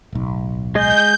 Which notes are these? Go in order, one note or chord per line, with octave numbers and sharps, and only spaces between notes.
D1 B1
G#3 G#4 D#5 G6